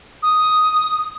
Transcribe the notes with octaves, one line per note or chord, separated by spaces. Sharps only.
D#6